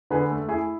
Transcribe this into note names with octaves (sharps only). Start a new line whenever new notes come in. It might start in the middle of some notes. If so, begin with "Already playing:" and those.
D3 G#4 B4
A3
E4 G#4